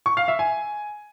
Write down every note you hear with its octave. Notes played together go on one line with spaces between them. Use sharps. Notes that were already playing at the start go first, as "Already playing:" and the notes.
C#6
F5
E5
G#5